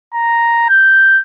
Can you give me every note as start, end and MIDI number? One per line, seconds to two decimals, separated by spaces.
0.14 0.67 82
0.69 1.20 91